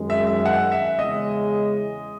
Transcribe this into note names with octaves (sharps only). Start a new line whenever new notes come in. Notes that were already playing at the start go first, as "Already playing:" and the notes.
Already playing: F#2 D#3 G#3
E5
E5
F#5
E5
E2 C#3 G#3 D#5